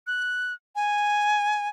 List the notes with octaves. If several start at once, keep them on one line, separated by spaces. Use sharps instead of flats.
F#6
G#5